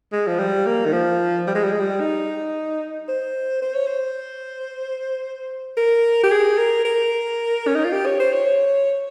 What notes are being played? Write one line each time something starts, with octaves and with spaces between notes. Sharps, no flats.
G#3
F3
G3
A#3
D#3
F3
G3
G#3
G3
G#3
G3
D#4
C5
C5
C#5
C5
A#4
G4
G#4
A#4
A#4
C#4
D#4
F4
G4
C#5
C5
C#5